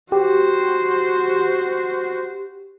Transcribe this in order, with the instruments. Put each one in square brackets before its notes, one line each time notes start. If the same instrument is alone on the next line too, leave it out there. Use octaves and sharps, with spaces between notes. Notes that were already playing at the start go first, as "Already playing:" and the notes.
[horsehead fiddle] F#4 C5 [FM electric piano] G4